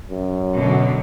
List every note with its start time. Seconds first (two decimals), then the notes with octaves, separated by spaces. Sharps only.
0.10 F#2
0.56 B2 D3 F#3